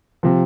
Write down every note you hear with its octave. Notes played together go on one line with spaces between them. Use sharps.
C3 F3